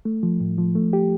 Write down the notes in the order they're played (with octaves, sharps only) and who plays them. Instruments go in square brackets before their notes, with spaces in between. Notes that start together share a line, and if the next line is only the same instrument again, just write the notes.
[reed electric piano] A3
F3
A2
F3
A3
G4